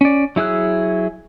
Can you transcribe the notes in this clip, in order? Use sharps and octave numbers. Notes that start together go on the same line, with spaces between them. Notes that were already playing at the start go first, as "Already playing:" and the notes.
C#4 D5
F#3 E4 G#4 E6 F#6